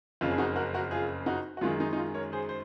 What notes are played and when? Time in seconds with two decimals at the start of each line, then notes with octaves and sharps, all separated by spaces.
0.21 F#1 F2 C#3 F4
0.31 G#4
0.38 D#4 F#4
0.56 F#4 A#4
0.74 F#4 A#4
0.91 F4 G#4
1.26 D#4 F#4
1.57 F#4
1.61 F#2 D#3 G#3 F4
1.80 D#4
1.93 D#4
1.97 F4
2.15 A#4 C#5
2.32 G#4 C5
2.49 C5